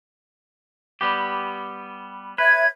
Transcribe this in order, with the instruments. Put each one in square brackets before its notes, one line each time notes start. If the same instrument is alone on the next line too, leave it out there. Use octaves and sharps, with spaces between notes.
[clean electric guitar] G3 B3 G4
[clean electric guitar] B4 [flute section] C#5 E5 G#6